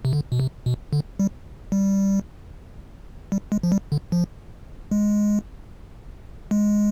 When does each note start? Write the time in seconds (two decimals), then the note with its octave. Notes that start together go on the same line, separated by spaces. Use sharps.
0.05 C3
0.13 D3
0.32 B2
0.40 C3
0.66 B2
0.93 D3
1.19 G3
1.72 G3
3.32 G3
3.52 G#3
3.63 F3
3.72 G3
3.92 D3
4.12 F3
4.91 G#3
6.51 G#3